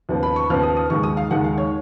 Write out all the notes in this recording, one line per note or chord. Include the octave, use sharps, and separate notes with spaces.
D#2 C#3 F3 B3
B5
C#6
D#2 C#3 F3 B3 F6
D#6
D#6
D#2 D#3 G#3 C#6
D#6
F5
D#2 D#3 G#3 F#5
F5
C#5